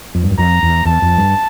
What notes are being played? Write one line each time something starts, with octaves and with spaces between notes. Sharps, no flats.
F2
G2
F#2
F2 A#5
E2
E2 A5
F2
G2